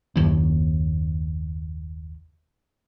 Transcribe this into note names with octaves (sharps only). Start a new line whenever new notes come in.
F#1 D#2